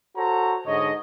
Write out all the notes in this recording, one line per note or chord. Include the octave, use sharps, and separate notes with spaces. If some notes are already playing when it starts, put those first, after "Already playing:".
F#4 A4 C5 C#5 A#5
G#2 D3 C#5 D#5